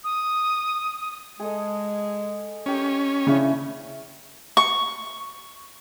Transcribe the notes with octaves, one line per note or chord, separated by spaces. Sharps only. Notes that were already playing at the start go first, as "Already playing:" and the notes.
D#6
G#3 G#4 A4 D#5
C#4 G4 A#4
C#3 D4 E4 D5
C#6